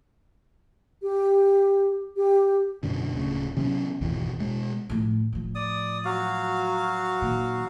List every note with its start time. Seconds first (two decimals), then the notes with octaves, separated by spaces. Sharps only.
1.02 G4
2.17 G4
2.83 F#2 B2 D3
3.12 D1 C#3
3.57 C3 F#3 B3 C#4
4.01 G#1 E2 B2
4.40 B2 G#3
4.90 A2 F3
5.33 A2 F3
5.55 D5 D#6
6.05 F#3 F#4 F5
7.22 A#2 D#3